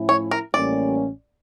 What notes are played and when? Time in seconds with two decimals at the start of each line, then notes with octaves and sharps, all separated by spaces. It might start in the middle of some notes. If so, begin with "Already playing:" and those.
Already playing: A2 F3 C#4 E4
0.09 C#5
0.31 A#4
0.54 A1 A2 G3 A#3 C#4 D5